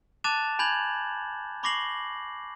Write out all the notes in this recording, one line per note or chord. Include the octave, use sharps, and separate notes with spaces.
A5 D6 F#6 A6 E7 F7
G#5 B5 G6 G#6 F#7
B5 C#6 D6 A#6 C7 F#7